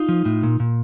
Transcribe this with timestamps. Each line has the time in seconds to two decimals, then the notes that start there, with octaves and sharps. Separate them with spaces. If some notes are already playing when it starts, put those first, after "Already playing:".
Already playing: D#4 F4
0.09 F3
0.25 A2
0.43 A#2
0.60 A#2